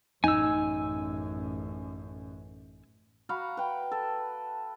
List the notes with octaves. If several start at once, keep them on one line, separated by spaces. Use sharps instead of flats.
A1 F#2 D#4 G#5 E6
F#4 F5 A#5 B5
B4 G5
A4